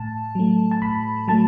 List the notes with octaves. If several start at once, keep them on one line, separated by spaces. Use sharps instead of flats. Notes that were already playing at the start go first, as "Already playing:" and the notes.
Already playing: A2 A5
F#3 A3
A5
A2 B5
F#3 A3 A5